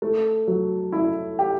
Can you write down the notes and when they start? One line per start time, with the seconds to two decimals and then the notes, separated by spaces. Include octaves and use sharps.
0.02 A3
0.48 F#3
0.92 E4
1.39 G4